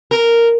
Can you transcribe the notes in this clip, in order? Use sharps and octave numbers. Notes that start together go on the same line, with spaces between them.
A#4